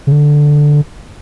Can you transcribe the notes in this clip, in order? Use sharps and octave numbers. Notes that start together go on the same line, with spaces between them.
C#3
D3